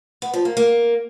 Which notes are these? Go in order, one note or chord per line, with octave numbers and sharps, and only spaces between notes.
B3
F3
A#3
A#3